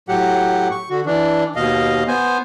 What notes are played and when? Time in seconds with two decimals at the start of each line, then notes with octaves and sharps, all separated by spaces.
0.09 A2 F#3 G4 F#5
0.71 C#6
0.90 D3 F#4
1.06 E3 D4
1.56 D#2 B2 D#5 F5
2.08 B3 C5 G#5